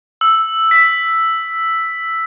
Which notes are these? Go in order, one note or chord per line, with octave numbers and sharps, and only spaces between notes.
E6
B6